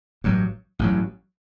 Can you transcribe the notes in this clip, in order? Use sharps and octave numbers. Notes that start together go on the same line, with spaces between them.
A1 G2 F#3
A1 G2 F#3